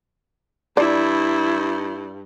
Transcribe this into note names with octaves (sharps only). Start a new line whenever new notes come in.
G2 E4 D5